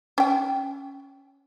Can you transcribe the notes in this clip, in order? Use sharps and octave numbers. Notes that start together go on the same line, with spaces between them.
C#4 G5